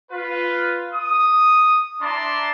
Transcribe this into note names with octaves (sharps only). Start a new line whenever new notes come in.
F4 B4
D#6
D4 E4 D5 A5 A#5 C6